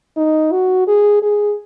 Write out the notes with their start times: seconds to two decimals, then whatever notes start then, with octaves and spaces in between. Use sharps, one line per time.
0.17 D#4
0.52 F#4
0.88 G#4
1.22 G#4